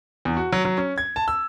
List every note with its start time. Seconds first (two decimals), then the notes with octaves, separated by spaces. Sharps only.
0.25 E2
0.37 F#4
0.53 F#3
0.65 F#3
0.78 C#4
0.98 G#6
1.16 A5
1.28 E6